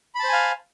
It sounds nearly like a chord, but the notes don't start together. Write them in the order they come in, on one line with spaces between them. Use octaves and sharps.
B5 A5 C5 G#5 F5